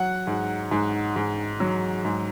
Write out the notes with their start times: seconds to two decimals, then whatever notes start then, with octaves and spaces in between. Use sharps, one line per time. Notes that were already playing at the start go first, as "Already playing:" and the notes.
Already playing: F#3 F#5
0.27 G#2
0.71 G#2
1.16 G#2
1.60 F#3
2.05 G#2